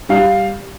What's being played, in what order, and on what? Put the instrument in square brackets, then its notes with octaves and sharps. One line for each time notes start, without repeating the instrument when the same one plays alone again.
[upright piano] G3 F5